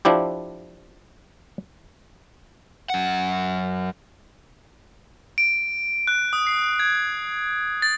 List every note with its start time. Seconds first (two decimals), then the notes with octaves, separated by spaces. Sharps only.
0.05 F3 D4 E4 G4
2.90 F#2 F#5
5.38 D7
6.07 F#6
6.33 D#6
6.47 C7
6.79 G#6
7.82 A6